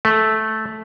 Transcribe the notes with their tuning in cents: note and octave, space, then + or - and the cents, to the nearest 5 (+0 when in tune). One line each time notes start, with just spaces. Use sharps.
A3 -10